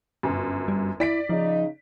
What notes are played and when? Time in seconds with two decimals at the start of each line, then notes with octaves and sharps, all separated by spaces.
0.23 G1 F#2
0.68 G3
1.00 E4 D5 B6 D7
1.30 C#3 F3 D#4